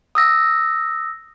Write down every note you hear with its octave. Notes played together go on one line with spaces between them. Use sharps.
D#6 E6 A#6